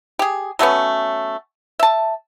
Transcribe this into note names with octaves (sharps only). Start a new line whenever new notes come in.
G4 G#4
F#3 A3 B3 C#4
E5 A5